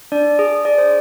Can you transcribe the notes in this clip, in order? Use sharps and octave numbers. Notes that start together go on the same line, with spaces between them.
D4 D5
G#4
G#4 D5
C5